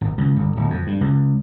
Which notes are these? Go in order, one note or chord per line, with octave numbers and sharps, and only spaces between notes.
G#1
C#2
G1
D1
F2
G2
C#2